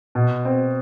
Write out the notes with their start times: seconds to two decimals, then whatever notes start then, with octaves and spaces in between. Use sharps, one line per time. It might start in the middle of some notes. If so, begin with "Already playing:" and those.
0.15 B2
0.45 C4